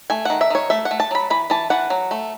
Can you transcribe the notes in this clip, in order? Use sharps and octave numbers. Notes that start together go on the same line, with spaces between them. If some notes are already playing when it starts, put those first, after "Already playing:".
A3 G#5
D#3 F#5
E5
D#3 C#5
A3 E5
F#5
A3
A5
F#3 B5
E3 B5
E3 A5
E3 F#5
F#3
A3